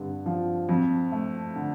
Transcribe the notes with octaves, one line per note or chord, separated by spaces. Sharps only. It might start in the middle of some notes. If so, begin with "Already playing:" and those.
Already playing: G2 D3
F3
F2
A3
D3